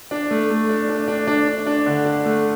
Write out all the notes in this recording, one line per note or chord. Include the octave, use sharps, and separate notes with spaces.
D4
A3
A3
D4
D4
D4
D4
D4
D4
D3
D4
A3